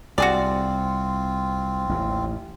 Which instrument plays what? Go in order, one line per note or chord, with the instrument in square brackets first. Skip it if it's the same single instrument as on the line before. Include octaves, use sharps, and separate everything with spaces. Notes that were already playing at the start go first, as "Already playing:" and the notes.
[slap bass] C2 [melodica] C4 F4 [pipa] F#4 G#4 D5
[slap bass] A1 D#2